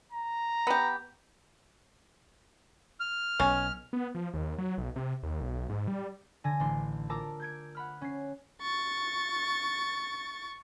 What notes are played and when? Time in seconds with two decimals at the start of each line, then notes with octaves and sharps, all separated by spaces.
0.12 A#5
0.67 B3 G4
3.00 F6
3.40 B1 C#4
3.93 B3
4.15 F3
4.34 D#2
4.58 F#3
4.78 B1
4.96 C3
5.23 D#2
5.41 B1
5.69 G#2
5.88 G3
6.44 D3 G#5 A#6
6.60 A1 D4 C6 C7
7.10 F4 A#4 A5 A#5 D6 E6
7.40 G6 G#6 D7
7.75 F#5 B5 F6
8.01 C#4 C7
8.62 C#6 A6